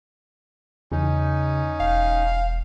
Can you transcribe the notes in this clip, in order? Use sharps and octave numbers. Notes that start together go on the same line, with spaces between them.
E2 C#3 C#4 D#4
E1 F5